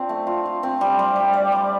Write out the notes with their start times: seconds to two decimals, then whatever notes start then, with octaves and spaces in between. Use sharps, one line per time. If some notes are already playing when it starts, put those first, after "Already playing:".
Already playing: C4 D4 F4
0.09 A3
0.27 F4
0.45 F4
0.63 C4
0.81 G3
0.99 G3
1.16 G3
1.33 D5
1.52 G3